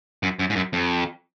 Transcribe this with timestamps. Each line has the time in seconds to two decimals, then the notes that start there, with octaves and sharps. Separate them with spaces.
0.23 F#2
0.39 F#2
0.50 G#2
0.56 F#2
0.73 F2